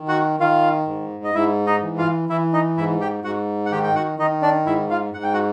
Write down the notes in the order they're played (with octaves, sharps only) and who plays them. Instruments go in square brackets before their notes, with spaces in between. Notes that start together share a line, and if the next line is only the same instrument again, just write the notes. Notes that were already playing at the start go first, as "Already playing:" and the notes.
Already playing: [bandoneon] D#3
F#4 F#5
D#3 F4 F5
G#2
D#5
G#2 E4 E5
D#4 D#5
E3
F4 F5
E3 E4 E5
D#4 D#5
G#2 E4 E5
G4 G5
G#2 F#4 F#5
F#5
D#3 G4 G5
G5
F#4 F#5
D#3 D#4 D#5
D4 D5
G#2 E4 E5
F4 F5
G#2 F#5
G5
F#4 F#5